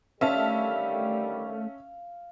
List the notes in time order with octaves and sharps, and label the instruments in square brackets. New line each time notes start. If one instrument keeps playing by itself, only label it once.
[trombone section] D3 D#3 G3 [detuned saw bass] A3 [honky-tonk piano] C#4 E5 A5 [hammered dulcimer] F5